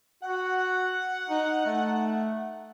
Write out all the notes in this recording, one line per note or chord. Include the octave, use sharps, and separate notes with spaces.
F#4 F#5
D#4
A3